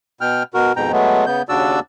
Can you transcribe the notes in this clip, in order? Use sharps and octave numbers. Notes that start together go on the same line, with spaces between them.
B2 G5 F6
B2 F#4 A#4
F2 G#2 B2 G5 A#5
F#3 G#3 A3 B3
C#3 B3 G6
D#2 C#3 D4 F#4 D5 E6